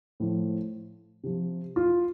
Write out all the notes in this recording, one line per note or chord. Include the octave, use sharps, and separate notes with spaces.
A2 F3
C3 F3
F4